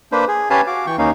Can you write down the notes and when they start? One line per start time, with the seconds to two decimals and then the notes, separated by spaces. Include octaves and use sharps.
0.12 A#3 D4 B4 C5
0.28 G#4
0.50 C#4 G4 B4 F5 G#5 A5
0.67 F#4 F5 D6
0.87 E3 G5 C#6
0.98 D#2 A#3 C#4 D#4 F5